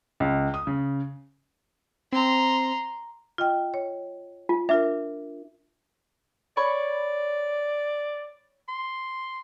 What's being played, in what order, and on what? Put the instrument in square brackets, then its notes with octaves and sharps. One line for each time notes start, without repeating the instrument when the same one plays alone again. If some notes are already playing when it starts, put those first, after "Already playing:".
[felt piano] C#2
D#6
C#3
[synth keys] C4 [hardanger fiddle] A#5 C6
[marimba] F4 D#5 G5
C#5
[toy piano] F4
[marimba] D4 F4 A#4 [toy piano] E5
[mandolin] C#5 B5 C#6 [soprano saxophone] D5
[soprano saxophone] C6